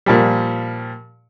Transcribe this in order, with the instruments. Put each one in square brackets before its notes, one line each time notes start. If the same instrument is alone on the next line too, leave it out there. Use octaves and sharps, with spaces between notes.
[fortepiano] A#2 F3 G3